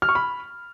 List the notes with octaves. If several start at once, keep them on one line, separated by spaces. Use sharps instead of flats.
F6
C#6
B5